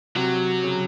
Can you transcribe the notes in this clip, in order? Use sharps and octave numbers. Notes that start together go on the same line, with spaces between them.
C3 F#3
C#3